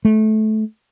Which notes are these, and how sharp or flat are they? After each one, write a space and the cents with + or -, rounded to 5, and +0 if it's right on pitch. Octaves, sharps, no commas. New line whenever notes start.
A3 -20